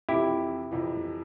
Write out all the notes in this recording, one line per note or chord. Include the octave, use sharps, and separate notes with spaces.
F2 C3 E3 E4 G4
F2 C3 E3